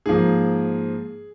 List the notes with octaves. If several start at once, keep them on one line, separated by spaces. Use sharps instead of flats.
G#2 F3 A#3 G#4